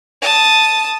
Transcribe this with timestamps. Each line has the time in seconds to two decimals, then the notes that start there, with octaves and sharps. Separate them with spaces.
0.22 A5 D#6